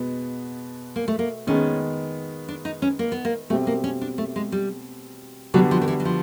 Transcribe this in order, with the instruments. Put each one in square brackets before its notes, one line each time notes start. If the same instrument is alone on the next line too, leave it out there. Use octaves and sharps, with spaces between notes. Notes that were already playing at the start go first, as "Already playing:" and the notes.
Already playing: [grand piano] B2 G#3 B3
[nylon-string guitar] A#3
A3
A#3
[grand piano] D#3 G#3 B3 [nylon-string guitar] C#4
[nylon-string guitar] D4
D#4
C#4
A#3
B3
A#3
[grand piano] B2 G3 C4 [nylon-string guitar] A3
[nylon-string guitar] A#3
C#4
D4
A3
G#3
G3
[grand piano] D3 G3 B3 D4 F#4 [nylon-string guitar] F#3
[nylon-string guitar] F3
D#3
E3
F#3
F3